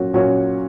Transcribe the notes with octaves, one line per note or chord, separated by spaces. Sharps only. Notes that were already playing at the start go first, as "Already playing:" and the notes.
Already playing: A#2 F#3 C#4 F#4
A#2 F#3 C#4 F#4 C#5